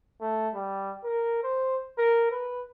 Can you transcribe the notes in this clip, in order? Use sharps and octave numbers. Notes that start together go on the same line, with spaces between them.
A3
G3
A#4
C5
A#4
B4